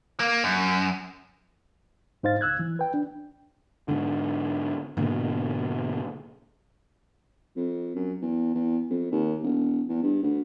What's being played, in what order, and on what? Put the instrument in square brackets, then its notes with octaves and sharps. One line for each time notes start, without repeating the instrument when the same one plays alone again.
[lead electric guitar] A#3
F#2
[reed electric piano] G#2 D#4 C5 F5 A6
C#2 E6 F#6 G#6
E3
B4 G5
D4
[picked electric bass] G#2 D3
G#2 B2 D3 A#3
[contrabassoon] F2
F#2
E2
E2
F2
D#2
E1
E2
G2
D2